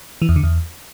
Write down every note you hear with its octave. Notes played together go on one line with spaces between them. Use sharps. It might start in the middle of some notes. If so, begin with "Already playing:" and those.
E3
E2
D3
E2